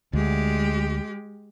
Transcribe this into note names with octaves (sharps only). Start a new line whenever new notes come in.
D2 G#3 G4